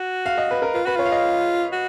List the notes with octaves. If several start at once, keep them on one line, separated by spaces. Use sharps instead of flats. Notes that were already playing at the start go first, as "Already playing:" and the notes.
Already playing: F#4
F5
D#5
B4
A#4
F4 B4
F#4 B4
F4 C#5
F5
D#5
F#4